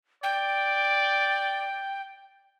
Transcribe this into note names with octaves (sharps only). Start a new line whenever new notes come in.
D5 G5